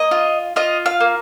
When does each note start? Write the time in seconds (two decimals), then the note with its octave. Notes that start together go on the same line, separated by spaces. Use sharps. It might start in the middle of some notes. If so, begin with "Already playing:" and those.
Already playing: A#3 D#5
0.11 F4
0.56 F4 D#5
0.86 F5
1.00 A#3